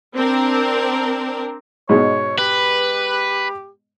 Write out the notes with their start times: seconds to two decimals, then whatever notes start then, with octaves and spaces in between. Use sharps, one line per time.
0.16 C4 D4 A#4
1.89 G#2 B2 G#3 C#5
2.39 G4 B4